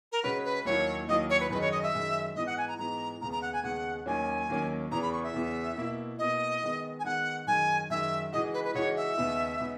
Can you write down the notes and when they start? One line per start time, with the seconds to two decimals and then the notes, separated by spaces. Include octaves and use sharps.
0.12 A#4
0.23 C#3 G#3 C#4 F#4 B4
0.45 B4
0.65 D#2 D#3 F#3 A#3 E4 C#5
1.08 D#2 D#3 F#3 A#3 E4 D#5
1.30 C#5
1.40 B4
1.50 F#2 D#3 G#3 D#4 B4
1.61 C#5
1.71 D#5
1.83 E5
1.93 F#2 D#3 G#3 D#4
2.36 G#2 E3 B3 D#4 D#5
2.46 F#5
2.58 G#5
2.68 A#5
2.78 G#2 E3 B3 D#4 A#5
3.21 D#2 C#3 G#3 B3 A#5
3.32 A#5
3.42 F#5
3.53 G#5
3.64 D#2 C#3 G#3 B3 F#5
4.06 D#2 D#3 F#3 A#3 C#4 G#5
4.49 D#2 D#3 F#3 A#3 C#4
4.91 E2 C#3 E3 B3 A#5
5.02 B5
5.12 C#6
5.24 E5
5.34 E2 C#3 E3 B3
5.77 B2 A#3 E4
6.19 B2 A#3 E4 D#5
6.62 D#3 G#3 B3
6.99 G#5
7.04 D#3 G#3 B3 F#5
7.47 F#2 D#3 G#3 G#5
7.90 F#2 D#3 G#3 E5
8.32 C#3 E3 G#3 D#4 F#4 D#5
8.54 B4
8.64 B4
8.74 C#3 E3 G#3 D#4 F#4 C#5
8.96 E5
9.17 D#2 C#3 G#3 B3 D#4
9.60 C#3 G#3 B3 D#4